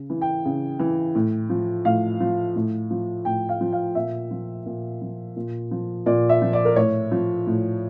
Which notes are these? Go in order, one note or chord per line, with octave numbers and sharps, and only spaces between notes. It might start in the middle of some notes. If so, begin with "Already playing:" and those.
Already playing: C#3
E3
G5
C#3
E3
A2
F3
A2 F5
F3
A2
F3
A2 G5
F5
F3
F5
A#2 E5
F3
A#2
F3
A#2
F3
A#2 D5
E5
F3
D5
A#4
A2 C#5
F3
A2